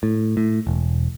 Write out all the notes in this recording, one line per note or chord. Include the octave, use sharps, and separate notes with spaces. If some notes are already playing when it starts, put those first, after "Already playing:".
A2
A2
E1